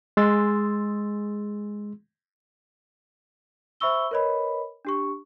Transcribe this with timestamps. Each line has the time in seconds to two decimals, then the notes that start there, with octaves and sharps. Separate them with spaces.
0.17 G#3 G#4 C6 E6 A6
3.80 C5 E5 B5 C#6 E6 G7
4.11 A#4 B4 C#5 D#5 B5
4.85 D4 G4 C#6